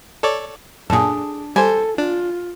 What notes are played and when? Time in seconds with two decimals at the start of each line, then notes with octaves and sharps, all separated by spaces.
0.23 A4 C#5 D5
0.90 F#2 A#2 D4 G#4 A4
1.56 G3 A4 C5 G#5
1.98 D4 F4